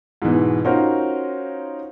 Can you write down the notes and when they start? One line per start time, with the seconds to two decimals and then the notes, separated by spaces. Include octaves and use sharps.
0.22 G#2 B2 E3
0.65 C#4 D#4 F4 F#4 A#4 C5